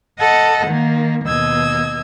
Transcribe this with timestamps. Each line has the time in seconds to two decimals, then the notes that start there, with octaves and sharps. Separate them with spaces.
0.18 A4 D#5 F#5
0.66 D#3 A#3
1.24 D#2 B2 D#5 E6 G#6